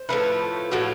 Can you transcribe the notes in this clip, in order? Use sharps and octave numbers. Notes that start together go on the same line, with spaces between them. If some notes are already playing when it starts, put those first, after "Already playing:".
Already playing: C5
A2 F3 A3 B4
A2 F3 A3 F#4